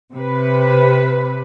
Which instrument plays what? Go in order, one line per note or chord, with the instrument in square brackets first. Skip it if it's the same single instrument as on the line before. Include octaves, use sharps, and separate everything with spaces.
[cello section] C3 B4